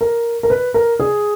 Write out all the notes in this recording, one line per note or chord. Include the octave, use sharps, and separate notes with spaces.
A#4
A#4
B4
A#4
G#4